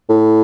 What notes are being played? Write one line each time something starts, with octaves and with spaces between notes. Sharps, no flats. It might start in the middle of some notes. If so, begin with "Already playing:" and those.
A2